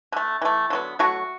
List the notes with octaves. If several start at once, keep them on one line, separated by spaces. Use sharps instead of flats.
D3 A3
E3 A3
D3 F#3 B3
B2 F#3 A3 F#4